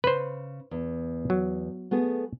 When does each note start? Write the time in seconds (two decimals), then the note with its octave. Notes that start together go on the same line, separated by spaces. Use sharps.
0.04 C#3 B4 C5
0.71 E2
1.30 F#3
1.91 A3 B3 G#4